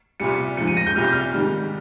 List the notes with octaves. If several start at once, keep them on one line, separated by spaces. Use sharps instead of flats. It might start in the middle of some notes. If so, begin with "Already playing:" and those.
C2 A#2 G3 C#7
G#2 F3 C#7
D#7
A#6
G6
C2 A#2 G3 F6
G6
F6
G#2 D#3 G3